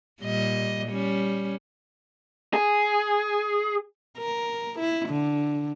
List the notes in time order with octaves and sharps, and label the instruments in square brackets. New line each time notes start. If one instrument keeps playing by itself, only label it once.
[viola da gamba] A#2 G3 D#5
G3 C#4
[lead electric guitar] G#4
[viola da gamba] A#4
E4
D3